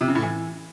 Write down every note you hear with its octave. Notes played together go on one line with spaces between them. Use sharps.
C3
C#3
A2
E3